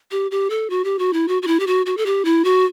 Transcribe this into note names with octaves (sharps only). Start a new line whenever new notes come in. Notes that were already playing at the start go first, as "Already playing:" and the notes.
G4
G4
A4
F#4
G4
F#4
E4
F#4
F#4
E4
G4
F#4
F#4
A4
G4
E4
F#4